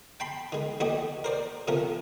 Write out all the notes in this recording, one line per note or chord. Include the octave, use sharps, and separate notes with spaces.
G5 A5 B5 C6
D#3 G#3
D#2 A3 G4 D#5
A#4 C5 D5
C3 F3 A3 A#4